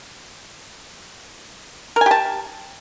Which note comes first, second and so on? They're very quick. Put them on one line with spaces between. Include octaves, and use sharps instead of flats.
A#4 G#5 G4 A5